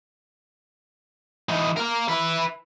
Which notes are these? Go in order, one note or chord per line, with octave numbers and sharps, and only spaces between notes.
E3 D#4
A#4 F5
E4 B4